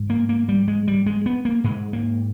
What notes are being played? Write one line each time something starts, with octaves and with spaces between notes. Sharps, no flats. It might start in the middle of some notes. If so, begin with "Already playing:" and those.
Already playing: G#2
A#3
A#3
G3
G#3
G3
G#3
B3
A#3
G#2 G#3
A#3